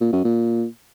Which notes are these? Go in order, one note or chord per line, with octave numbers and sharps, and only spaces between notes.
A#2
F#2
A#2